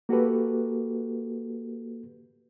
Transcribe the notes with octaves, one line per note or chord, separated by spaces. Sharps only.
A#3 F#4 G4 A4 B4